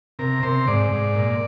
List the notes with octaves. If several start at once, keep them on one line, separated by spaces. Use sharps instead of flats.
C3 A#4
C3 C5
G#2 D5
G#2
A#2